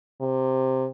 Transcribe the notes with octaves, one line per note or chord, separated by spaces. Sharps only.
C3